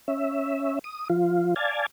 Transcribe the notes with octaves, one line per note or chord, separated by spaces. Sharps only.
C#4 E5
D#6
F3 F4
D5 F5 G#5 A5